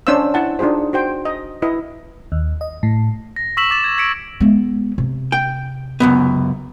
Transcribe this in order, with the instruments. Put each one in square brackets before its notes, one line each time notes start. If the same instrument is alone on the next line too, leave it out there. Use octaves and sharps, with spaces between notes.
[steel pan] C#4 D4 C5 C#5 F5 E6
E4 F#5 A5
D4 D#4 F4 G#4 C5
F#4 C5 G5
D#5
E4 B4 D#5
[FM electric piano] D#2
D#5
A2
[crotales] A#6
C#6 E6 B6 E7 F#7
D6 A6 E7
G#6
G#6 B6 C#7 D7
[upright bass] G#3 B3
C3
[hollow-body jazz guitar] G5
C#2 F#2 B3